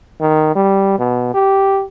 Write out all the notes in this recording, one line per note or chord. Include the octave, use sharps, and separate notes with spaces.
D#3
G3
B2
G4